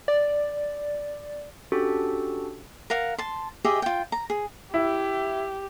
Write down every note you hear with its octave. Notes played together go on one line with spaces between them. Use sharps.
D5
C#4 D4 F#4 G4 A4
A#4 F5 F#5
A5 C6
G4 G#4 D#5 E5
F4 G5
A#5
G#4
E4 G4